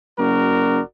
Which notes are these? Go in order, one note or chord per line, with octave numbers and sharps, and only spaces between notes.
F#1 F#4 A#4 D5